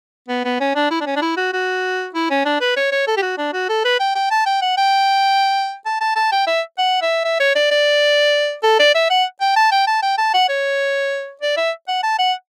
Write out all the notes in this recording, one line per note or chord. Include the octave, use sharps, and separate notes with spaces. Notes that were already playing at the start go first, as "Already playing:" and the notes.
B3
B3
C#4
D4
E4
D4
C#4
D4
E4
F#4
F#4
E4
C#4
D4
B4
C#5
C#5
A4
G4
F#4
D4
F#4
A4
B4
G5
G5
A5
G5
F#5
G5
A5
A5
A5
G5
E5
F#5
E5
E5
C#5
D5
D5
A4
D5
E5
F#5
G5
A5
G5
A5
G5
A5
F#5
C#5
D5
E5
F#5
A5
F#5